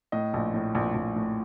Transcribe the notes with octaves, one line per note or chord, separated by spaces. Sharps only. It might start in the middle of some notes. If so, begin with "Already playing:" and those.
A2 D#5
A#1
A2
A#1
A#1
A2